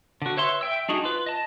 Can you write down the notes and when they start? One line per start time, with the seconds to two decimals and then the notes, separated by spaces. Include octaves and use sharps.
0.22 D3 F#4
0.37 B4 C#5 E5 C6
0.61 E5 G5 E6
0.89 D4 D#4 F#4 G#4
1.04 F4 B4
1.26 D#5 A5